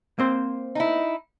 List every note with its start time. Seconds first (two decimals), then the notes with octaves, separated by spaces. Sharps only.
0.19 A#3 C4 C5
0.75 D#4 E4